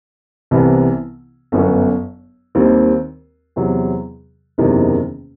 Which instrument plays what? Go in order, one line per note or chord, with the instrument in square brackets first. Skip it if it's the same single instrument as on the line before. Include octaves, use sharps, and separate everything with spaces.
[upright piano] C2 C3 E3 B3 E4
G1 F#2 F#3 B3 F#4
D#2 D#3 G3 C4
E2 C3 F#3
F#1 E2 C3 D#3